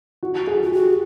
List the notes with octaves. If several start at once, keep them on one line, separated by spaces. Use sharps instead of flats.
F#4
G#4
F4
F#4 G4